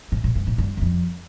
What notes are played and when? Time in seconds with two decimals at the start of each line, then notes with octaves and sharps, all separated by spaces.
0.12 A2
0.24 A#2
0.35 G2
0.47 A2
0.58 G2
0.77 E2
0.81 F2